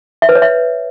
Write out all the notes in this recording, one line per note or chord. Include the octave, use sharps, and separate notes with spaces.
E5
B4
C#5
E5